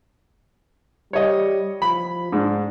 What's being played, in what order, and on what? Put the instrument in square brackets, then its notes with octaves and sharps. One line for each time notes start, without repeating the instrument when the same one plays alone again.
[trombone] G3 [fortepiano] C#5 D#5
[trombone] F3 [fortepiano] B5
[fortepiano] G#2 [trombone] D4